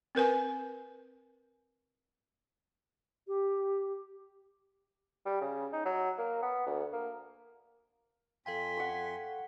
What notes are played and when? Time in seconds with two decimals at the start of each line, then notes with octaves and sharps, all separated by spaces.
0.15 C4 A#4 B4 G#5
3.27 G4
5.26 G3
5.41 C#3
5.73 D#4
5.85 F#3
6.18 A#3
6.43 B3
6.66 D2
6.93 A#3
8.46 F2 A4 F5 G5 G#5 C6 B6
8.77 F#5 C#6